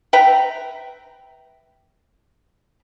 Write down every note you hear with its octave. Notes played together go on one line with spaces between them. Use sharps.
B4 E5 G5 A#5